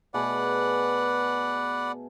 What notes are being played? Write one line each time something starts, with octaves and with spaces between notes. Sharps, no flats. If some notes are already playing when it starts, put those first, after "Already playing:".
B2 A3 G#4 B4 D5 F#5